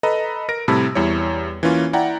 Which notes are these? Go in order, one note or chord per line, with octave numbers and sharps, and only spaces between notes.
A4 B4 D#5 A#5 B5
A#4 A#6 D7
A2 C3 G3 A5 B5 E6
E2 G3 E4 C#5
E3 A#3 C#4 F4
E4 D5 F#5 G5 A#5